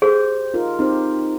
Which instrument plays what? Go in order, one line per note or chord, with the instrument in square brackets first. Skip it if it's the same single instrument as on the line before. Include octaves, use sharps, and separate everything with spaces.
[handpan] G4 [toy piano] G#4 [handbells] C5
[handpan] D#4 F4 A#4
[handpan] C4 G4 C5 [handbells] D#4